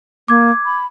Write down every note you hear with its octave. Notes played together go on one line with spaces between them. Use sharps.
A#3 D6 G#6
B5